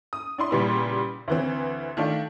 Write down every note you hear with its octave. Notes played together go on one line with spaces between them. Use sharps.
D#6
D4 E4 C6
A#2 C#3 G3 B3 E4
D2 E3 C4
D#3 A3 D4 F4